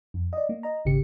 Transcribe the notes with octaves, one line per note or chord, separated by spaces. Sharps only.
F2
D5 D#5
A#3
D#5 A#5
G#1 D#2 C#3 G4 C#7